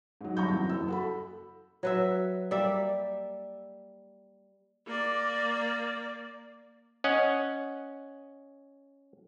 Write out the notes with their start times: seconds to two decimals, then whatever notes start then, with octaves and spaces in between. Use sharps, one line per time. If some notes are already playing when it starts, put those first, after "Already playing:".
0.21 G#2 F#3
0.37 G1 G2 A#5 C#6 G6
0.52 C3 E3 F#3
0.69 F#1 E6
0.88 F#4 A4 B5
1.83 F#3 B4 E5
2.51 G3 A#3 D5 E5
4.86 A#3 D5
7.04 C#4 D#5 F#5